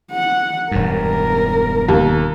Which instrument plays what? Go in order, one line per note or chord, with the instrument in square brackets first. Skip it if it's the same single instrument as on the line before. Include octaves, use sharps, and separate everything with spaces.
[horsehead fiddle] F#5
[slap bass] E1 G2 [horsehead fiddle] A#4
[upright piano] D#2